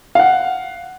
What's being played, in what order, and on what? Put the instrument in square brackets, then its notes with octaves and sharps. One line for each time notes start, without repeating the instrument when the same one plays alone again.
[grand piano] F5 F#5